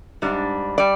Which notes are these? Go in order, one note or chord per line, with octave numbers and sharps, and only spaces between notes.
G#2 G3 D4
G3 D5